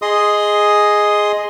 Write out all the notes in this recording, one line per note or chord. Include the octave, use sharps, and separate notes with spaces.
G#4 D#5 C6 D#6